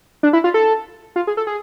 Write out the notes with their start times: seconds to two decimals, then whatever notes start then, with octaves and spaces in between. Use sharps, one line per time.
0.23 D4
0.33 E4
0.44 F4
0.54 A4
1.16 F4
1.27 G#4
1.37 A4
1.47 G#4